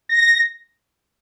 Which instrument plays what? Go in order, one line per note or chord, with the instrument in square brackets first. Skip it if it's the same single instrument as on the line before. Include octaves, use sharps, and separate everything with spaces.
[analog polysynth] A#6